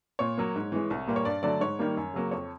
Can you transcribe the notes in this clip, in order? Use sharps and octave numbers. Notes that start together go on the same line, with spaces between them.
A#2 C#5
F#3 A#3
G#2
E3 G#3
C2
A#2 G3 A#3
C#5
G2 D5
D3 F#3 A3 D5
G#2 C#5
D#3 G3 A#3
F#2
C#3 F#3 A#3
F2 C#5